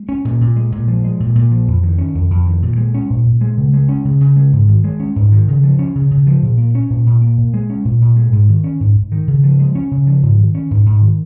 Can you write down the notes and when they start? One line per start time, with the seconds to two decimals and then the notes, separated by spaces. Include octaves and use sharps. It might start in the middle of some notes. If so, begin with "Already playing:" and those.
Already playing: G#3
0.09 C#4
0.25 A#2
0.41 A#2
0.56 G#3
0.72 A#2
0.88 F3
1.04 G#3
1.20 A#2
1.35 A#2
1.52 F3
1.68 F2
1.83 D#3
1.98 C#4
2.15 F2
2.30 F2
2.47 D#3
2.62 A#2
2.78 G#3
2.94 C#4
3.10 A#2
3.26 A#2
3.41 G#3
3.57 C#3
3.73 G#3
3.89 C#4
4.05 C#3
4.21 C#3
4.36 G#3
4.53 G#2
4.68 D#3
4.84 G#3
5.00 C#4
5.16 G#2
5.32 D#3
5.48 C#3
5.63 F3
5.79 C#4
5.95 C#3
6.11 C#3
6.27 F3
6.43 A#2
6.58 A#3
6.75 C#4
6.90 A#2
7.06 A#2
7.22 A#3
7.38 A#2
7.54 G#3
7.70 C#4
7.85 A#2
8.01 A#2
8.17 G#3
8.33 G#2
8.49 D#3
8.64 C#4
8.80 G#2
8.96 G#2
9.12 D#3
9.28 C#3
9.44 F3
9.60 G#3
9.75 C#4
9.91 C#3
10.07 F3
10.23 G#2
10.38 D#3
10.55 C#4
10.71 G#2
10.86 G#2
11.01 D#3